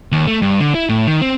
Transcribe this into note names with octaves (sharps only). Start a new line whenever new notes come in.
D#2
A3
G2
D3
E4
A2
D#3
C4